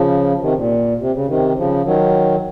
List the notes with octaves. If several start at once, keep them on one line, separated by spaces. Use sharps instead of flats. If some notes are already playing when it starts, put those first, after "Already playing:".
Already playing: C#3 F3
C3 D#3
A#2
C3
C#3
C3 D#3
C#3 F3
D#3 F#3